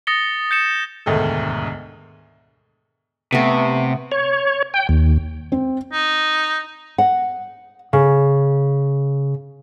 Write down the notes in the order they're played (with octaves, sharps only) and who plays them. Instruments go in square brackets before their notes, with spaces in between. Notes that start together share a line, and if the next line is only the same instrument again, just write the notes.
[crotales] D#6 A6 A#6 C#7 G7
G6 C#7 E7
[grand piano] E1 D2 G#2 D#3 A3 A4
[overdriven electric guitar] C3 [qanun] A3 B3
[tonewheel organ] C#5
G5
D#2
[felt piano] C4
[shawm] D#4
[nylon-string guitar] F#5
C#3